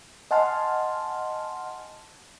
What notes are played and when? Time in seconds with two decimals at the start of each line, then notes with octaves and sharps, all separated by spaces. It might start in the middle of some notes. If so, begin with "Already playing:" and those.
0.31 D#5 F#5 G#5 A5 C6 F6